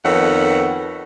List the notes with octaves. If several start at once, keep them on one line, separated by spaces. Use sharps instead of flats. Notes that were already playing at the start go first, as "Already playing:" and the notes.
F2 D#3 B3 A4 C#5 F#5